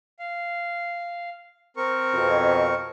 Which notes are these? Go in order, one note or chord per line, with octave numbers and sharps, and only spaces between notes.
F5
C4 A#4 C#6
F2 B2